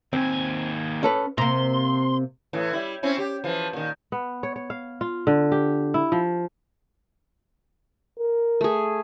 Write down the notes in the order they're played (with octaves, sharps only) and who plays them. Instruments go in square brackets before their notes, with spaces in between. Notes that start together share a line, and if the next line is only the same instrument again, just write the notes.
[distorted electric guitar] D#2 G#5 [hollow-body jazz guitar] C4
[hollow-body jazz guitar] C#4 A4 B4
[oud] C3 A#3 [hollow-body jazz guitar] A#5 [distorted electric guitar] C6
[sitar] A2 E3
G3 E4
C4 C#4 E4
G4
E3 F3
A#2 D#3
[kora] B3
C#5
C#5
F5
F4
D3
G4
E4
F3
[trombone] A#4
[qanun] A3 G#4